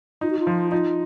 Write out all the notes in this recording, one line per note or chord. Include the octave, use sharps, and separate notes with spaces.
D#4 F4
F#4
F4
F3
D#4 F4